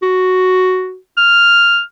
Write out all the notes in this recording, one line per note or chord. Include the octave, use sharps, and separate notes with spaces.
F#4
F6